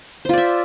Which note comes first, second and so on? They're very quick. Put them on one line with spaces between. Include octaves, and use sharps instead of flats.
C5 F4 D5 E5